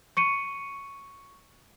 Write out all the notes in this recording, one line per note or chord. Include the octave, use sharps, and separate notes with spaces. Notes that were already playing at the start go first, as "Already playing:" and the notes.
C#6 C#7 D#7